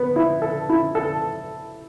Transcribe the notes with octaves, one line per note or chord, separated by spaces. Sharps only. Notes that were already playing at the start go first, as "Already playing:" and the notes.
Already playing: B3
E4
A4
E4
A4